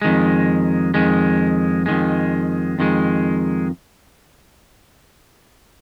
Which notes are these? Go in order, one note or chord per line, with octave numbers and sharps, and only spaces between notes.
F2 D#3 G#3
F2 D#3 G#3
F2 D#3 G#3
F2 D#3 G#3